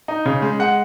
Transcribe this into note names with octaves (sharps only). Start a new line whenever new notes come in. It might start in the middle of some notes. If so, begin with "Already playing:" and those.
D#4
C#3
G#3
G#3 F#5